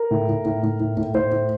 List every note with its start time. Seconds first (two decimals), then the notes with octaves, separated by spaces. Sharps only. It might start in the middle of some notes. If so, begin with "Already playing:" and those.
Already playing: A#4
0.11 A2
0.28 A2
0.45 A2
0.63 A2
0.80 A2
0.97 A2
1.14 A2 C5
1.32 A2